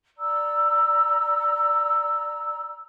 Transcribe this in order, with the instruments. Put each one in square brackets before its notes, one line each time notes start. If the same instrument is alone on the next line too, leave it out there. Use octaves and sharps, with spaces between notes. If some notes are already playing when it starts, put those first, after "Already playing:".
[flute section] D5 A#5 E6